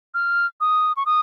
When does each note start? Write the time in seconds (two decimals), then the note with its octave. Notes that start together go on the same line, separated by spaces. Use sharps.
0.14 F6
0.61 D#6
0.97 C#6
1.06 D#6